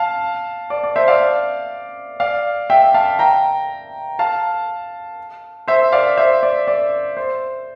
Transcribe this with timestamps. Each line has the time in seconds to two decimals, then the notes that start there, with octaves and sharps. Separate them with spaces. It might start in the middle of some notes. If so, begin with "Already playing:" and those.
Already playing: F5 A5
0.70 D5
0.84 D5
0.96 C5 E5
1.08 D5 F5
2.20 D5 F5
2.70 E5 G5
2.94 F5 A5
3.19 G5 A#5
4.19 F5 A5
5.68 C5 E5
5.92 D5 F5
6.17 C5 E5
6.43 D5
6.67 D5
7.17 C5